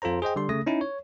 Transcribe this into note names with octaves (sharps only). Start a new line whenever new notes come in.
F2 F4 A4 C5 A#5
G#4 C5 D#5 G5
D3 G3 C6
C#3 A3 D#6 A#6
C#4 D#4 E4
C#5